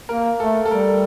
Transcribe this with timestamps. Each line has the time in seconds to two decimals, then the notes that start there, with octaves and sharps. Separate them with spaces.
0.09 A#3 A#4
0.40 A3 A4
0.65 A4
0.71 G3 A#4